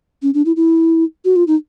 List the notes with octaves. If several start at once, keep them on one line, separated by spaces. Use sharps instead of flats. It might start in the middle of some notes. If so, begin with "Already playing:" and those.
C#4
D4
E4
E4
F#4
F4
D#4